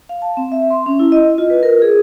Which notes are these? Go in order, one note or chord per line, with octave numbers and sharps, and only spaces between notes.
F5
A5
C4
E5
C6
C#4
E4
D#5
F4
B4
A#4
G#4